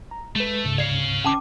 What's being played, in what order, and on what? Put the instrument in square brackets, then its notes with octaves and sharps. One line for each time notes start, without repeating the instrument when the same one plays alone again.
[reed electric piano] A#5
[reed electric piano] G#3 B4 [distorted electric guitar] A3
[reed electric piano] D2 G#2 C#3
[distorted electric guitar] C#5 F5 [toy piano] D5
[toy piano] C#4 A5 D6